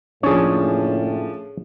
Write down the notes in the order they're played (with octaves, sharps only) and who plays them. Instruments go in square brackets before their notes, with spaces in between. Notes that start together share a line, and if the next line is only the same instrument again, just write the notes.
[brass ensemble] F#1 A2 [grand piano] F3 C#4 D4 [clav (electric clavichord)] G#4 C#5